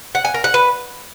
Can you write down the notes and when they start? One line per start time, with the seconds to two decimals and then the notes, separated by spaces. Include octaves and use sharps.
0.15 F#5
0.25 G#5
0.34 A#4
0.44 F#5
0.54 B4